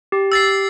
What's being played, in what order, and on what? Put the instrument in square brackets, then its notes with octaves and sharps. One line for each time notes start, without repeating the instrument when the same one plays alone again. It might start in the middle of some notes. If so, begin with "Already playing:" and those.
[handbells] G4
[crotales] E6 A6 C7